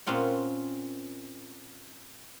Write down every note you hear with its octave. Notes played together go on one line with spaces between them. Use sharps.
A#2 C4 C#4 F4 F#5